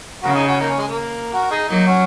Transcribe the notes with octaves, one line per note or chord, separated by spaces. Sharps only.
C#3 F#4 A#4
D#4 G#4
C#4 F#4
A#3 D#4
C#4
G#3
A#3
F#4 A#4
D#4 G#4
F#3 A#3 D#4
C#4 F#4